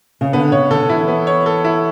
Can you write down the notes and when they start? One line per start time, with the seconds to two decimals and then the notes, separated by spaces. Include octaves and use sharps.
0.21 C#3
0.33 D3 B3
0.52 C#3 C#5
0.71 D3 A4
0.81 D3
0.90 E3 E4
1.08 B3
1.27 C#5
1.46 A4
1.64 E4